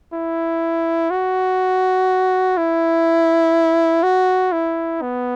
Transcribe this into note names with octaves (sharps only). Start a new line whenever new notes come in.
E4
F#4
E4
F#4
E4
B3